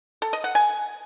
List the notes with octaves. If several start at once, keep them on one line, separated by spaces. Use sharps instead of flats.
A4
D#5
F#5
G#5